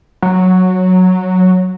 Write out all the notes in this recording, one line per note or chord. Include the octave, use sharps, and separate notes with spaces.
F#3